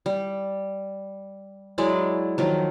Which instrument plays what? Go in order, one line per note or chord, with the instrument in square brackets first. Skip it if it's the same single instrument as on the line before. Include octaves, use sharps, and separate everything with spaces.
[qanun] G3
F#3 G#3 E4 D5
D#3 F3 F#3